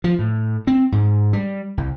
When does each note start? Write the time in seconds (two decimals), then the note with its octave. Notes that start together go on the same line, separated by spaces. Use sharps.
0.04 F3
0.19 A2
0.67 C4
0.92 G#2
1.33 G3
1.77 C2